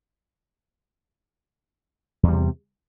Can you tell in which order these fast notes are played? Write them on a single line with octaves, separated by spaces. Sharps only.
E2 G3 C3